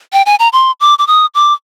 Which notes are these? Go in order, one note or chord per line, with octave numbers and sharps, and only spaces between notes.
G5
G#5
A#5
C6
D6
D6
D#6
D6